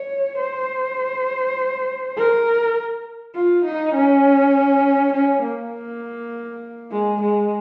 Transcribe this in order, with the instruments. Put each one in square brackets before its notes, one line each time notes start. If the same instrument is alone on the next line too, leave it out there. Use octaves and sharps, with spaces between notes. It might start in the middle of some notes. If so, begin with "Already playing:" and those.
Already playing: [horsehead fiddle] C#5
C5
A#4
F4
D#4
C#4
C#4
A#3
G#3
G#3